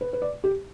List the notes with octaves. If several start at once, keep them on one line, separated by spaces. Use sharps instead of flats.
B4
B4
D5
G4